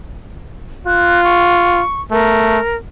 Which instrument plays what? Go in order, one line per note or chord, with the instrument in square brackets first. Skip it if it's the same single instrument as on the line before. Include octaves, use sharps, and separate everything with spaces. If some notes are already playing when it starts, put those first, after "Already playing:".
[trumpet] F4 [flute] F#6
[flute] C#6
[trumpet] A3 [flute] A#4